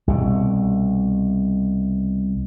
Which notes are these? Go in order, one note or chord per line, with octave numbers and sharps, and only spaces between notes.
C2 B2